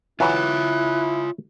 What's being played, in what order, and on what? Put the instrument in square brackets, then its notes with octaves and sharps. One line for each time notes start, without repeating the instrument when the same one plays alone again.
[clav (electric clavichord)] E3 F#3 [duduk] E4 [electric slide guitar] F4 C#5 [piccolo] F#6